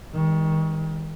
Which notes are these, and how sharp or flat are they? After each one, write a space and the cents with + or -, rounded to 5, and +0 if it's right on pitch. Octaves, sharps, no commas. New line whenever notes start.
D#3 +30 G#3 -35